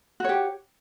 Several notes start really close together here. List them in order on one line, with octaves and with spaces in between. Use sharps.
F#4 C#5 G4